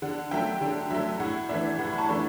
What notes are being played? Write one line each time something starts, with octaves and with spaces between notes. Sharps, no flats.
D3 F#5
F#3 A3 E5 G5
D3
F#3 A3 E5
A2 F#5
E3 A3 D4 E5
A2 F#5
B5
A5 C#6
E3 A3 D4